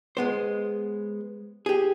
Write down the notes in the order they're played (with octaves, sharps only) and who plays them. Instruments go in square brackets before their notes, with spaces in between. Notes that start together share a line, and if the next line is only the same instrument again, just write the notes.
[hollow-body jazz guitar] G#3 B3 C5
G4 G#4